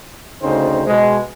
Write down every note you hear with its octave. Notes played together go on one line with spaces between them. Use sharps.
D2 C#3 C4 D#4 C5
B2 G#3